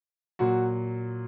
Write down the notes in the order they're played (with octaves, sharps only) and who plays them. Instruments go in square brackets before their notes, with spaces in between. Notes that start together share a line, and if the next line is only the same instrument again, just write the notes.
[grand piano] A#2 F#3 F#4